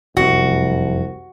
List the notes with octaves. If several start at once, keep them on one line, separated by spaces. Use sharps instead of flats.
F1 C2 F#2 C4 F#4